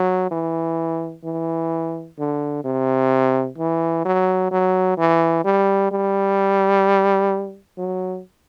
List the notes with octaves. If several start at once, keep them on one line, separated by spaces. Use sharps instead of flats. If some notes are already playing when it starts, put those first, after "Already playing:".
Already playing: F#3
E3
E3
D3
C3
E3
F#3
F#3
E3
G3
G3
F#3